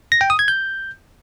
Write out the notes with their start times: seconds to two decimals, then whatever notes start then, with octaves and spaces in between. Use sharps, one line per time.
0.12 A#6
0.21 G5
0.30 D#6
0.39 G#6
0.48 G6